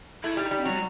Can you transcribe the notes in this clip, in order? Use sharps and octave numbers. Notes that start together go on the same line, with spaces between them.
A3 E4
G3
D#4
G3
F#3 C4
G3